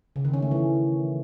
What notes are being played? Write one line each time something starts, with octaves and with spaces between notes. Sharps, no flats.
C#3
D#3
C#4
A3
E3